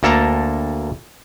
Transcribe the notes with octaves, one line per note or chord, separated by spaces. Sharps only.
D2 A#3 A4 A5 A#5